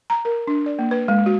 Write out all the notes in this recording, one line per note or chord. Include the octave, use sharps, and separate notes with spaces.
A#5
A#4
D4
D5
A#3
B4
G#3
F#4